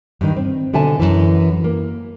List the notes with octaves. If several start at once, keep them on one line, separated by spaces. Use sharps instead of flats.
G2 D#3
C4
B2 D3 E5 G#5 A5
F#2 E3
A#3